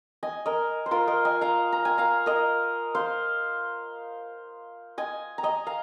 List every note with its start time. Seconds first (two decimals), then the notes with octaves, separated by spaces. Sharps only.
0.23 D#5 G#5
0.46 A#4 D#5
0.86 C5
0.91 F4 A#4
1.07 A#4 D#5
1.25 D#5 G#5
1.41 F5 A#5
1.72 A#5
1.85 G#5
1.98 F5 A#5
2.26 A#4 D#5
2.95 C5 F5
4.98 D#5 G#5
5.38 A#5
5.43 D#5 G#5
5.67 F5 A#5